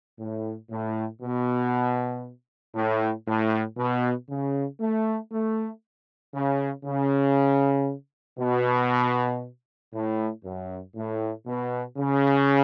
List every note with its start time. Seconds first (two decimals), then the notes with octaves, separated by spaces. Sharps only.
0.19 A2
0.70 A2
1.22 B2
2.76 A2
3.27 A2
3.77 B2
4.30 C#3
4.81 A3
5.32 A3
6.35 C#3
6.85 C#3
8.40 B2
9.93 A2
10.44 F#2
10.96 A2
11.47 B2
11.98 C#3